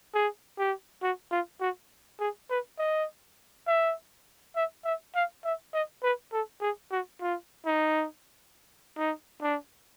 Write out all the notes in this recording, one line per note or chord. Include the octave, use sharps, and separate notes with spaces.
G#4
G4
F#4
F4
F#4
G#4
B4
D#5
E5
E5
E5
F5
E5
D#5
B4
A4
G#4
F#4
F4
D#4
D#4
D4